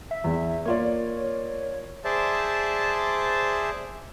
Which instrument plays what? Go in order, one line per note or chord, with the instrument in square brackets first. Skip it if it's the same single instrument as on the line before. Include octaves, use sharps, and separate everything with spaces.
[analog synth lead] E5
[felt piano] E2
[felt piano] A#3 F4 D5 [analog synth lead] C#5
[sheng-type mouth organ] G#4 C5 D5 E5 A5